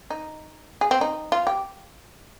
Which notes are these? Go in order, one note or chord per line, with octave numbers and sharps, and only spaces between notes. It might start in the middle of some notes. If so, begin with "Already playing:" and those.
D#4
G#4
C4
D#4
F4
G4